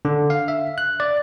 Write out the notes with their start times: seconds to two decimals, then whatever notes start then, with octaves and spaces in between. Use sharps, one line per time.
0.05 D3
0.30 F5
0.48 E5
0.78 F#6
1.00 D5